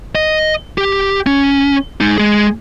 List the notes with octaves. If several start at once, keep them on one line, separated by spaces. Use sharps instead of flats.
D#5
G4
C#4
G#3 D#4
G#3 G#4